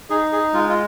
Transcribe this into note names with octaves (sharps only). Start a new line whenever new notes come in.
D#4 G#4
G#4
G#3 F4
F4